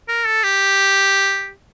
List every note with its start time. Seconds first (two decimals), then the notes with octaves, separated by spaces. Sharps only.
0.08 A#4
0.26 A4
0.44 G4